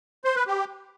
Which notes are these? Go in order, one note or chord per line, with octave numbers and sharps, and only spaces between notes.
C5
B4
G4